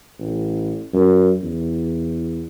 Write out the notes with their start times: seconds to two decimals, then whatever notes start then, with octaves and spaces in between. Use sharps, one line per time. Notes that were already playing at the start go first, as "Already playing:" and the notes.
0.19 A1
0.93 F#2
1.42 E2